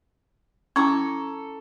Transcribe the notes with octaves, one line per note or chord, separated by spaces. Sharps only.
C#4 E4 A4 A#5 C#6 D6